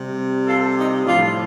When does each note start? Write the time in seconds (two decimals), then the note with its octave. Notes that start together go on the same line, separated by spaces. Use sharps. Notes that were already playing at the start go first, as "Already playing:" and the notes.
Already playing: C3 G3
0.46 F4 A4
0.76 D#4 G4
1.05 A2 F3 D4 F4